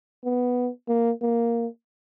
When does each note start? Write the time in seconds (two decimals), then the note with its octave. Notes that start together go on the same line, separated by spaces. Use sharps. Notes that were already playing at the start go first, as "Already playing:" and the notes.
0.25 B3
0.89 A#3
1.22 A#3